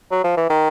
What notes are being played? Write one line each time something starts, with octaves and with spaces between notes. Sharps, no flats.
F#3
F3
E3
D#3